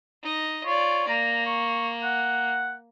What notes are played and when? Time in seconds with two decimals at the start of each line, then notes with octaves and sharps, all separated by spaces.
0.23 D#4 D#5
0.66 F4 C#5 D5
1.08 A#3 A#5
1.46 C#6
2.03 F#5